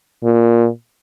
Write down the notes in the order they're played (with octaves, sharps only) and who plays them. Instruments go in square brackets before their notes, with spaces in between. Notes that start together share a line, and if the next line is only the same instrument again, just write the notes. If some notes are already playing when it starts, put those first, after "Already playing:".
[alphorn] A#2